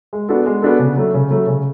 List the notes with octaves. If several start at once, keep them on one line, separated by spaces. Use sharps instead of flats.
G#3
B3 D4 F#4 A4
G#3
B3 D4 F#4 A4
C#3
F#3 A3
C#3
F#3 A3
C#3